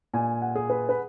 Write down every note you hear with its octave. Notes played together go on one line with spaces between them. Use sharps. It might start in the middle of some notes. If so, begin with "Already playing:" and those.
A#2 G#5
F#5
G#4
B4
B4